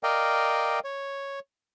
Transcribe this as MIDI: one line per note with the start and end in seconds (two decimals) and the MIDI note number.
0.03 0.79 70
0.03 0.79 74
0.03 0.79 75
0.03 0.79 77
0.03 0.79 79
0.84 1.39 73